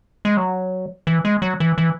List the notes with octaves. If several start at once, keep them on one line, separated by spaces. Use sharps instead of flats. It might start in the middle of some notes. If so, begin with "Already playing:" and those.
G#3
F#3
E3
G#3
F#3
E3
E3